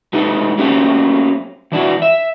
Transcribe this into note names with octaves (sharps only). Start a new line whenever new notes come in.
G#3 A3 D#4 G4 A4
F#3 A3 A#3 C4 C#4 G4
E3 D4 E4 F#4
E5